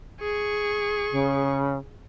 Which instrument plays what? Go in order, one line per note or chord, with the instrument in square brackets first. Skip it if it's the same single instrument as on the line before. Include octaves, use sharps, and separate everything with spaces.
[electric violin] G#4 C#6
[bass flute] C#3